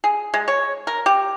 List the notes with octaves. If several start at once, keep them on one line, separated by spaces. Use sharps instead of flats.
G#4
G#3
C#5
A#4
G4